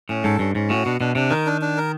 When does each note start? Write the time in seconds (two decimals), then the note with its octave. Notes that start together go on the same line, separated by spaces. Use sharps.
0.09 A2 C#4
0.24 G#2 A4
0.39 G2 C#4
0.55 G#2 C#4
0.70 A2 F#4
0.86 B2 D4
1.00 B2 D4
1.15 C3 D4
1.31 D#3 A#4
1.46 D4
1.61 D4
1.77 A#4